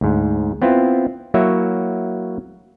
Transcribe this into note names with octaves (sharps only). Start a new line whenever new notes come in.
D2 G#2
B3 C4 E4 F4
F#3 A#3 E4 F#4 C#5 E5